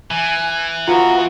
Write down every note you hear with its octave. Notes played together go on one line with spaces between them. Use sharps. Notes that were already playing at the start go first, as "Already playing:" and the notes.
E3 G#5
B3 F4 F#4 F#5 A#5